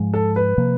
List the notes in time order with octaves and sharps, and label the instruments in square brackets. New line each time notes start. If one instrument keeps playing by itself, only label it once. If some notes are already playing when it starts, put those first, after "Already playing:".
Already playing: [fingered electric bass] G#2 F3 G#3
[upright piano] A4
B4
[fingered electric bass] C3 F3 A#3